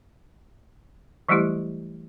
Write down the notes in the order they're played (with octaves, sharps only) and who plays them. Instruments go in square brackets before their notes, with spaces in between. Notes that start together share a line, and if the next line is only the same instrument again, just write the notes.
[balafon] E3 F#3 G3 A3 E4 G4